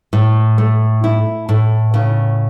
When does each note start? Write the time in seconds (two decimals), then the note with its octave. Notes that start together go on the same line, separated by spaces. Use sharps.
0.13 A2
0.58 A3
1.04 E4
1.49 A2
1.94 C#3